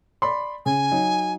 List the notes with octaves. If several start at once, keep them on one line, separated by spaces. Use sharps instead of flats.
D5 B5 C6
C#3 G#5
F#3 D#4